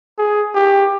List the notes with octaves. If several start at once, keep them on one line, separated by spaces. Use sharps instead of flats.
G#4
G4